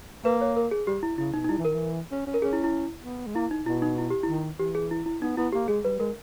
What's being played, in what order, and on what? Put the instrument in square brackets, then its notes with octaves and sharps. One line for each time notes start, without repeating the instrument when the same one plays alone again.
[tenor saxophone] A#3 [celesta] B4
[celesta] C#5
A#4
G#4
[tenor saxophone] G3 [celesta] G4
[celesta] E4
[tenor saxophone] C#3 [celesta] E4
[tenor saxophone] B2 [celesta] D#4
[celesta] D#4
[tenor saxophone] G3 [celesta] E4
[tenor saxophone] E3
[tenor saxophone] D#3 [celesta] A#4
[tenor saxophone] E3
C#4
C#4
[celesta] A#4
[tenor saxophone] C#4 [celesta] G#4
[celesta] E4
E4
[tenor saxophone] B3
G#3
[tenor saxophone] A#3 [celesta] E4
[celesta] D#4
[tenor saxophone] B2 [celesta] E4
[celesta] D#4
E4
G4
E4
[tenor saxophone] D#3
[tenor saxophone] E3 [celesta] G4
[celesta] G#4
E4
E4
[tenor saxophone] B3 [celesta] D#4
[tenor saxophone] B3 [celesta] E4
[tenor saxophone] A#3 [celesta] G4
[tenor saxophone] G#3 [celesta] G#4
[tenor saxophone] G3 [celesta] B4
[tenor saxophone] G#3 [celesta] A#4